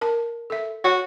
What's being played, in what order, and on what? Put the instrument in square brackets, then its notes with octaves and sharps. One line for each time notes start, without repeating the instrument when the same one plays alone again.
[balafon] A#4 A5
A4 E5
[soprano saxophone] F#4 [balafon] C#5 F#5